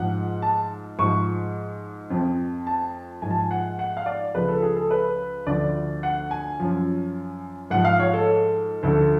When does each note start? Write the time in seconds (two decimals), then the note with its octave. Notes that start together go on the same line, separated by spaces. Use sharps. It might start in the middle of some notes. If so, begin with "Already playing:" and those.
Already playing: G#2 F3 F#5
0.42 A5
0.99 G#2 F3 C#6
2.10 F2 F3
2.67 A5
3.22 G#2 G#5
3.27 F3 A5
3.39 G#5
3.51 F#5
3.79 F#5
3.97 F5
4.06 D5
4.35 C#2 C#3 F3 B4
4.48 A4
4.62 G#4
4.77 A4
4.91 B4
5.47 D2 D3 F3 D5
6.03 F#5
6.31 G#5
6.60 F#2 F3
7.70 G#2 F3 F#5
7.85 F5
8.00 C#5
8.13 A4
8.83 D2 D3 F3 A4